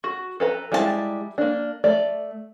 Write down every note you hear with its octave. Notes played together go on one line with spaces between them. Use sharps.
F#4
A4 B4 A#5
G3 G#3 E4 F4 A5
A#3 D4
A3 D5